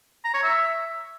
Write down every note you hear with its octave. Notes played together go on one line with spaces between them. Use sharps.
A#5
C#5
E5